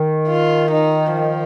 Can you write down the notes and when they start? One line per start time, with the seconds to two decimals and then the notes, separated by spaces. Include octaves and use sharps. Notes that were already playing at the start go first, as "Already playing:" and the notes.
Already playing: D#3
0.28 F4
0.71 D#4
1.14 F3